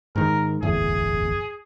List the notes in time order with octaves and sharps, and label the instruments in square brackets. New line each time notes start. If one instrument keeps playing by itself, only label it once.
[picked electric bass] G#2 D#3 [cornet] A#4
[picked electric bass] D1 G1 E2 [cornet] G#4